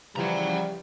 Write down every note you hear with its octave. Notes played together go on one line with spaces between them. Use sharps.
C#3 E3 F3 G3 F#5 A#5